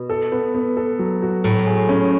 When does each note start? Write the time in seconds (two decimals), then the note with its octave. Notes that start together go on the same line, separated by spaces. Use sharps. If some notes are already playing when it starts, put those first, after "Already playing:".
Already playing: B2
0.10 A4
0.32 B3
0.54 B3
0.77 A4
0.99 F#3
1.22 F#4
1.44 A2 F#3
1.67 G#4
1.89 C#4